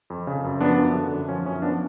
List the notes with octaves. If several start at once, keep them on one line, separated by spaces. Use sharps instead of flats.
F2
C#3
F#2
F3 B3 D4
F#2
D3
F#2
F3 C#4
F#2 C#4
F3 B3 D4